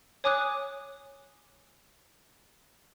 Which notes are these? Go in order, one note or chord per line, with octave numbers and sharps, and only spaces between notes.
C#5 G#5 D6 D#6 F#6